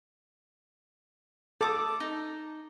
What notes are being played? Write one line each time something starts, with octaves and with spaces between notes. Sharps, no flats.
A4 D5 D6 D#6
D#4